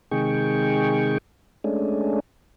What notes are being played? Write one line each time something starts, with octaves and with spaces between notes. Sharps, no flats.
C3 D#3 G#3 G#4 G5 C#6
G#3 A3 C#4 D4